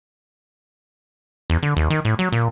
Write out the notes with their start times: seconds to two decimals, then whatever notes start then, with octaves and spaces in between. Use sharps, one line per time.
1.50 E2
1.63 D3
1.77 D#2
1.90 D#3
2.05 A2
2.19 F#3
2.32 A#2